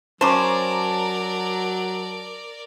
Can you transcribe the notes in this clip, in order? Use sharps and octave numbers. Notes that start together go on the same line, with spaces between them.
F#3 C#4 A#4 C5 D5 A5 A#5 D6